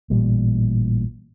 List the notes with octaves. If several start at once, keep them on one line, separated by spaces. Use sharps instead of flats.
A1 A#2 G3